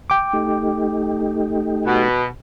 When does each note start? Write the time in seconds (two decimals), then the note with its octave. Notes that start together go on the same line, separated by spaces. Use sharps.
0.10 G5 D6
0.33 A3 D#4 G4
1.86 B2